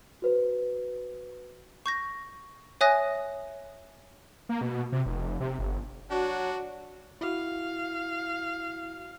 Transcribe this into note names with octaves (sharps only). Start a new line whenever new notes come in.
F#4 B4 C5
C#6 G6 A#6
C#5 E5 G#5 D#6 F#6 A#6
A#3
B2
C3
F1
C3
G1
F#3 D4 F#4 C#5
E4 F#4 F5